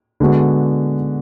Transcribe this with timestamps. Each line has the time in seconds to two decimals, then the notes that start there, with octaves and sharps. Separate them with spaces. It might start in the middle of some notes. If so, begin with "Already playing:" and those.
0.20 D3 G#3 B3 F#4